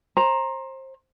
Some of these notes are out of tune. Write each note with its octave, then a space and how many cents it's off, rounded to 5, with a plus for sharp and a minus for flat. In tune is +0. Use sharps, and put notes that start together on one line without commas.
C5 +25 A#5 +5